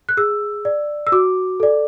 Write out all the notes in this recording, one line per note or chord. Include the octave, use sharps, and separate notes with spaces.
F#6
G#4 E6
D5
E6
F#4 D6
A4 D5